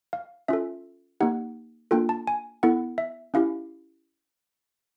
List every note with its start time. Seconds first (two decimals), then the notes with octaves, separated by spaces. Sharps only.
0.13 F5
0.48 C#4 F4 A4 E5
1.20 A#3 D#4 G4 F#5
1.91 A#3 D4 F4 A4 G5
2.09 A5
2.27 G#5
2.63 B3 E4 A4 F#5
2.98 E5
3.34 C#4 E4 G4 F5